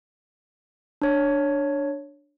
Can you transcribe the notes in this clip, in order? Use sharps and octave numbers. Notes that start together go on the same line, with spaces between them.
D4 C#5